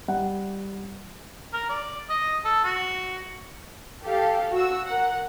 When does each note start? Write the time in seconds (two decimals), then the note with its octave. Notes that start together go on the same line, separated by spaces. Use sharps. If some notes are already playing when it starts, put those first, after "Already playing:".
0.08 G3 F#5
1.54 A#4
1.69 D5
2.10 D#5
2.45 A4
2.64 F#4
4.03 G4 A4 F5
4.52 F#4 E6
4.86 A#4 F#5